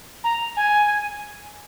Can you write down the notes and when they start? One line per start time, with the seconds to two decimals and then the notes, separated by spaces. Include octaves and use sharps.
0.24 A#5
0.56 G#5